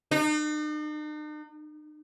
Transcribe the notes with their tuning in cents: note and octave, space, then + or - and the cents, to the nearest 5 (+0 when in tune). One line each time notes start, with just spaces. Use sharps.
D#4 -45